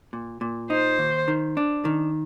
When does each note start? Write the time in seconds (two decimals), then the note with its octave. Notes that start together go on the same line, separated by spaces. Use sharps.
0.13 A#2
0.41 A#2
0.70 D#4 C5
0.99 D#2
1.28 D#3
1.57 D4
1.85 D#3